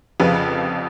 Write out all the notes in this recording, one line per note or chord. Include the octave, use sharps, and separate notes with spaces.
F1 F2 C#3 F3 B4